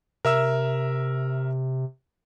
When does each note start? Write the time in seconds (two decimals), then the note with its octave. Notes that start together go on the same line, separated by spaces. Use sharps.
0.25 C3 A#4 E5 E6